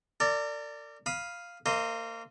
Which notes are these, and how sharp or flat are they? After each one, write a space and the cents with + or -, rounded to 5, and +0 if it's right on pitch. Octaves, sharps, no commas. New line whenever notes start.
A#4 -40 D5 +0
F5 +0 B5 -20 D#6 +0
A#3 -30 C5 +0 D#5 +0